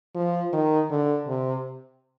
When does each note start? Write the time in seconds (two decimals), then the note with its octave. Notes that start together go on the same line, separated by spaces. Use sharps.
0.15 F3
0.53 D#3
0.90 D3
1.28 C3